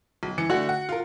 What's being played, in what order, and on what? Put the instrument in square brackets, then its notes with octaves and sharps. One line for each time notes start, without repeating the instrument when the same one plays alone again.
[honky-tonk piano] B1
E3 C#7
[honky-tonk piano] D3 A3 F#5 [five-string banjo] F#4
[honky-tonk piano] F#5
F4 A#4